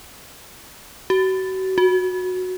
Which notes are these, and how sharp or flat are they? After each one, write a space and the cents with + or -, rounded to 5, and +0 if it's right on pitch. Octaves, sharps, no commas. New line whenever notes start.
F#4 +35
F#4 -15